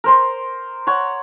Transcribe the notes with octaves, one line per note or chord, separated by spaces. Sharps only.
A#4 C5 C6
C#5 F#5 C#6